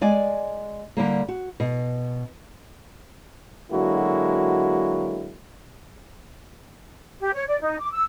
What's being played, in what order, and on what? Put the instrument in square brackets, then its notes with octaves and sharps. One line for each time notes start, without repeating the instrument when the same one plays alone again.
[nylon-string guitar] G#3 D5 G#5
D3 G3 A#3
F#4
B2
[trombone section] D3 F#3 G#3 A#3 E4 F#4
[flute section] G4
C#5
D5
D#4
D6
E6